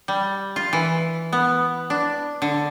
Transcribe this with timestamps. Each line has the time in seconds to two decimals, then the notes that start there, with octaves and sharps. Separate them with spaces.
0.08 G3
0.56 F4
0.73 E3
1.33 B3
1.90 D4
2.42 D3